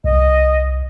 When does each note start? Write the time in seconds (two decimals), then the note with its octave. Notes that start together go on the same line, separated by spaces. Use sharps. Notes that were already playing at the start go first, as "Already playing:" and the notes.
0.04 C2 D#5